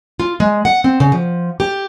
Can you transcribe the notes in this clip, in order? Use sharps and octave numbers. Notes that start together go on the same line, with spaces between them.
F4
G#3
F#5
C4
C#3
F3
G4